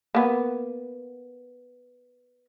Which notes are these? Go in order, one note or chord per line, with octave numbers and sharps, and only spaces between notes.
A#3 B3